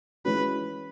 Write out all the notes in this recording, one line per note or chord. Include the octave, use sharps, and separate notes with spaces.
E3 G#3 C#4 F#4 B4